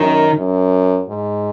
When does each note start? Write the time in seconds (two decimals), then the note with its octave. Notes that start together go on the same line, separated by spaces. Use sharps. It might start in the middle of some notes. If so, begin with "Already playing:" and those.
Already playing: F#2 D#3
0.38 F#2
1.09 G#2